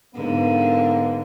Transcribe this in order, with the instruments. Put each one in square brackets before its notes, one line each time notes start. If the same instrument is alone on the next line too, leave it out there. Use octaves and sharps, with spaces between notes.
[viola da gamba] G#2 D3 [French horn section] A#3 B3